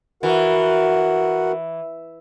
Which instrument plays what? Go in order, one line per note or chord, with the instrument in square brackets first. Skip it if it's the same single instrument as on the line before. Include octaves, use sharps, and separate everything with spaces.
[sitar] E3 [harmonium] F#4 A#4 F#5